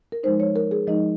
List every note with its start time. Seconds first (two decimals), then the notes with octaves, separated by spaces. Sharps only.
0.12 A#4
0.23 F3 G#3 D#4 C5
0.40 C#5
0.56 A#4
0.71 G#4
0.87 F3 G#3 D#4 D#5